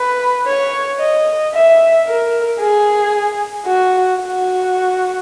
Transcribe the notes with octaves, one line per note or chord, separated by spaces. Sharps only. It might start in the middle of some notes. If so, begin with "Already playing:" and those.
Already playing: B4
C#5
D#5
E5
A#4
G#4
F#4
F#4